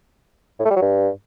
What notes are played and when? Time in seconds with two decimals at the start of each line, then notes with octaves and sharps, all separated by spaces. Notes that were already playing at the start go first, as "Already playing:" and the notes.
0.60 A2
0.65 A3
0.71 G3
0.76 F#3
0.82 G2